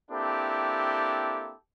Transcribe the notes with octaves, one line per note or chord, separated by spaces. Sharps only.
A#3 C4 D4 E4 G4 A4